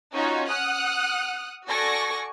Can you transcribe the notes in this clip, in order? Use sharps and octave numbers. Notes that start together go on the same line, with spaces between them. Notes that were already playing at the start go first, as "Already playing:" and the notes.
C#4 D#4 F4 F#4 C#5
F#5 D#6 F6 F#6
F#4 A4 D5 G#5 C#6 A#6